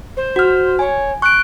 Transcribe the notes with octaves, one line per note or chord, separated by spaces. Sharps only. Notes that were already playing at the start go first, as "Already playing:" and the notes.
C5
F#4 F6
C#5 G#5
C#6 F#6 D7